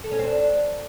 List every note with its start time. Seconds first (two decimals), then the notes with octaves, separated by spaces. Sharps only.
0.04 A4
0.12 C#4
0.19 C4
0.27 D4